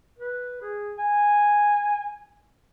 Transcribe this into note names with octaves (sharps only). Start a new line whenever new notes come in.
B4
G#4
G#5